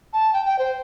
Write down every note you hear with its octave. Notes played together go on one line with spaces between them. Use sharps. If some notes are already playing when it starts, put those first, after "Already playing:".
A5
G5
G5
C5